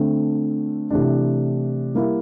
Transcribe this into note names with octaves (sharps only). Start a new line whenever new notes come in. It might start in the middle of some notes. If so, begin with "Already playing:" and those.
Already playing: D3 A3 C4
C3 E3 A3 D4
G3 A#3 E4 G4